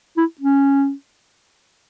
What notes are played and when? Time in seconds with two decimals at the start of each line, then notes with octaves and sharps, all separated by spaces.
0.17 E4
0.41 C#4